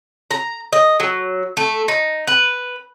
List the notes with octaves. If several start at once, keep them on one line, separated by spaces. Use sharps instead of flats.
A#5
D#5
F#3
A3
D#4
B4